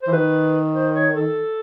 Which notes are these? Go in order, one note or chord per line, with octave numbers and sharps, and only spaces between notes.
E3 C5
D#3 B4
C5
C#5
A4